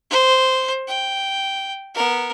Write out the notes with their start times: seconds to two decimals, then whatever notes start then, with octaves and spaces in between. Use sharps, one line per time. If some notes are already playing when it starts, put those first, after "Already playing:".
0.11 C5
0.88 G5
1.95 B3 A#4